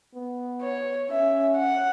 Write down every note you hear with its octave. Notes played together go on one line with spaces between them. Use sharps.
B3
C#5
C#4 E5
F#5